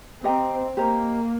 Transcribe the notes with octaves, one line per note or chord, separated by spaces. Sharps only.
C4 G4 D#5 G5 A#5
A#3 G4 C5 D#5 A#5